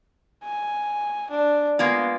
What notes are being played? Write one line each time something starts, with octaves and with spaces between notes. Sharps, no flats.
G#5
D4
G#3 A#3 B3 F4